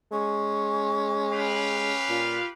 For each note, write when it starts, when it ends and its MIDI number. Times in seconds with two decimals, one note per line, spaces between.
0.13 1.94 56
0.13 2.33 61
0.13 1.36 85
1.33 2.49 67
1.33 2.49 71
1.33 2.49 77
2.09 2.39 46
2.09 2.45 65